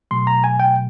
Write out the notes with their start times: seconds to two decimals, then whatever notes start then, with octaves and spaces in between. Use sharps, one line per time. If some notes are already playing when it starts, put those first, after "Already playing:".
0.11 B2 F#3 A3 C6
0.27 A#5
0.44 G#5
0.60 G5